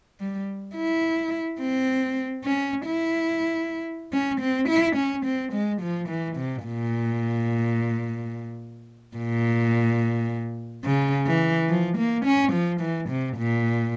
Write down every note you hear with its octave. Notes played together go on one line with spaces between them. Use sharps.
G3
E4
C4
C#4
E4
C#4
C4
E4
C#4
C4
G#3
F3
E3
C3
A#2
A#2
C#3
E3
F3
A#3
C#4
F3
E3
C3
A#2